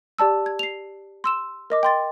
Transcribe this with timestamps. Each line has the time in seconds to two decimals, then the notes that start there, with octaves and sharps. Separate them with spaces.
0.19 G4 D5 A5 E6
0.46 G#6
0.59 C7 F7
1.24 C6 E6 E7
1.70 A#4 D#5 D6
1.83 G5 C6 A6